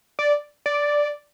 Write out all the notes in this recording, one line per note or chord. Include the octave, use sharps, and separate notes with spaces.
D5
D5